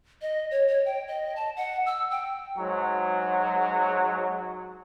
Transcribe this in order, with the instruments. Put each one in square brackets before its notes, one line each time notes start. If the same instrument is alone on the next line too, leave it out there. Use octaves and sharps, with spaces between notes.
[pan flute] D#5
C#5
C#5
G5
D#5
A5
F#5
E6
G5
[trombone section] G#2 F#3